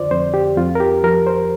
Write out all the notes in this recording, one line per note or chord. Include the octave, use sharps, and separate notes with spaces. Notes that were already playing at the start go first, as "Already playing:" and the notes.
Already playing: F2 D3 F4 C5 D5
F2 C5
G4
F2 F4
A#4
G4
F3 A#4
C5